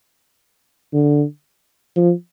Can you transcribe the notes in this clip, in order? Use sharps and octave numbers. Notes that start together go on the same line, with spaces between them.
D3
F3